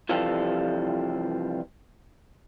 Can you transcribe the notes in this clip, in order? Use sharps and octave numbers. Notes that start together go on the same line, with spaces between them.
C3 E3 F3 G3 F4 A4